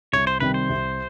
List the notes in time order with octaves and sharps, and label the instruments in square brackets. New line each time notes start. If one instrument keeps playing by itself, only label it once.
[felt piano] C2 [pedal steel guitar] C#5
[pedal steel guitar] C5
[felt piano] C3 D#3 G3 C4 [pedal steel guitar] B4
[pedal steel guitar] C5
[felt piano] C2